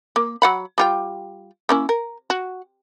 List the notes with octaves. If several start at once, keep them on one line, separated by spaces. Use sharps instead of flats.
A#3
F#3 F#5 B5
G3 F4 G5
A#3 C#4 E4
A#4
F#4